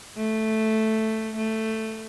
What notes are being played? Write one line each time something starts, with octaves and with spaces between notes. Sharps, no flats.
A3
A3